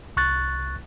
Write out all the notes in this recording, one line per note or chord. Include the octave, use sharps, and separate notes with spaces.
C2 C#6 F#6 A6